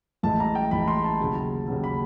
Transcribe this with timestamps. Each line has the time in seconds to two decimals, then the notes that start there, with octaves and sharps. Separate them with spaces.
0.23 A1 A2 E3 G#3 A5
0.40 A#5
0.55 G5
0.71 A1 A2 E3 G#3 B5
0.88 C6
1.04 A5
1.20 D#2 C#3 F#3
1.68 D#2 C#3 F#3
1.84 B5